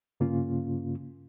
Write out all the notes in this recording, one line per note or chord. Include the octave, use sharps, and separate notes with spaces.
G2 C#3 A#3 C#4 F4